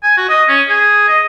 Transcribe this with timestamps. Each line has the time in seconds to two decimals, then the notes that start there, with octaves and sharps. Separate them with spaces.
0.03 G#5
0.17 F#4
0.29 D#5
0.49 C#4
0.69 G#4
1.08 D#5